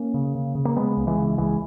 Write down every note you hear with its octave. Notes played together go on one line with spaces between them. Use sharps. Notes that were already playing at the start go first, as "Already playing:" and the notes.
Already playing: A#3 C#4
C#3
C#3
C#3
A#3
C#3 G#3 B3
C#2
E3 G#3
C#3
C#2 E3 G#3